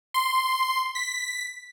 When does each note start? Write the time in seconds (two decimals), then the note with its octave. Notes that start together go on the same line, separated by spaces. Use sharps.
0.14 C6
0.95 B6